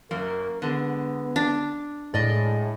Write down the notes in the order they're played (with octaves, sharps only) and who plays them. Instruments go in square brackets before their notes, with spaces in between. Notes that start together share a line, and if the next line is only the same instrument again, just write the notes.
[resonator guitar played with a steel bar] F#2 F#3 A#3 [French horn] A#4
[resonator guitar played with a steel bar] D3 G#3 [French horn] B3
[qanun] D4
[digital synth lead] A2 [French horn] G#3 [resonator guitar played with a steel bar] D5 D#5